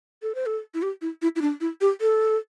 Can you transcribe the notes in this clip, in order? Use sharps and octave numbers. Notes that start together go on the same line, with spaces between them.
A4
C5
A4
E4
G4
E4
E4
E4
D4
E4
G4
A4